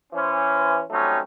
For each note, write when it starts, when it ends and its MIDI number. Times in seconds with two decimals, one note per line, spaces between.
0.13 0.82 52
0.13 0.82 61
0.13 0.82 72
0.91 1.19 54
0.91 1.19 55
0.91 1.19 57
0.91 1.19 60
0.91 1.19 61
0.91 1.19 63